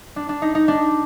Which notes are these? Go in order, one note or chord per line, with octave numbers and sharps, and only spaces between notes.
D4
D4
D#4
D#4
D4